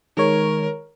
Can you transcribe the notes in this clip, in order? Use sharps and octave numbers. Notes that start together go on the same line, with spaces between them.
D#3 G#3 A#4 C#5